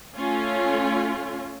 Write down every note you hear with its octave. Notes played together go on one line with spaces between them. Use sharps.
A3 C#4 F4